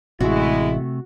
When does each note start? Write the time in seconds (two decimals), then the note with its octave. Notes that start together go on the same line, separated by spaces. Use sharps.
0.20 A1 C3 G#3 A3 E4 F#4